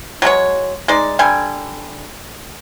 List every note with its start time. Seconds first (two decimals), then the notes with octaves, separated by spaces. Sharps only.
0.22 F#3 G#3 A4 C#5
0.88 G#3 D#4 D5
1.19 D3 G3 G#5